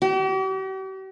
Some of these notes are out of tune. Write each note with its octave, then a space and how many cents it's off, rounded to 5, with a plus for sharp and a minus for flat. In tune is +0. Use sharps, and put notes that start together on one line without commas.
G4 -45